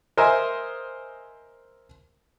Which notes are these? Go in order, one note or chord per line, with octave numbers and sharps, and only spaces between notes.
A#4 C5 D#5 E5 G#5